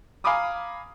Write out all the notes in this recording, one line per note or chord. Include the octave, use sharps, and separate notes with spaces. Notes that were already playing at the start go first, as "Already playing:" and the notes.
F5 G#5 A#5 B5 D6 D#6